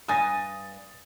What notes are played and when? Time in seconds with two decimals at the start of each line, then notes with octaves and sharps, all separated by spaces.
0.08 G2 G#5 D#6 A6 A#6